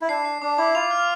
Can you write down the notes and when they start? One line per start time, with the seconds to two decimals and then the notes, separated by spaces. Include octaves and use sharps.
0.01 E4
0.09 D4 C7
0.25 C7
0.42 D4 D6
0.58 E4 D6
0.75 F4 F7
0.91 F6